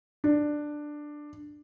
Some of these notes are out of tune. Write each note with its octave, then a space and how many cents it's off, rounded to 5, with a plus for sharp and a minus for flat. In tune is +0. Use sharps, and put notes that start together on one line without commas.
D4 +10